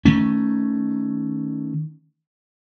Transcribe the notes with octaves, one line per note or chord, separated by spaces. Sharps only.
D#3 A3 C#4